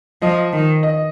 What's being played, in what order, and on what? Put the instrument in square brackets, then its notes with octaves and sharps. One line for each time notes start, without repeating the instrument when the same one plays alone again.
[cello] F3 [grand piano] D#5
[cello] D#3
[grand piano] D#5